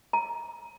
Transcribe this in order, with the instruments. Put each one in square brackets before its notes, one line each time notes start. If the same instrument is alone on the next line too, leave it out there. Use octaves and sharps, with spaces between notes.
[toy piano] A#5